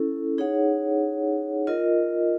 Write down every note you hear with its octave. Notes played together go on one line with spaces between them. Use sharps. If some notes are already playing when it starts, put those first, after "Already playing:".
Already playing: C#4 E4 A4
D#4 G#4 C#5 F#5
F4 A#4 D#5